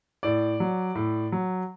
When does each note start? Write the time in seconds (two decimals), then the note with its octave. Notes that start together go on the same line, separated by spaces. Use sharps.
0.23 A2 D5
0.60 F#3
0.95 A2
1.32 F#3